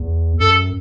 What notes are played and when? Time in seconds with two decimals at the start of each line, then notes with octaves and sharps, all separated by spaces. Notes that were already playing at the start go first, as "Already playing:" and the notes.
Already playing: E2
0.40 F#2 A4